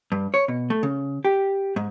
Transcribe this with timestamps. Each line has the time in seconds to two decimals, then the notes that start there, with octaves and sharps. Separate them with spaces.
0.12 G2
0.34 C#5
0.48 B2
0.70 A3
0.83 C#3
1.25 G4
1.76 G#2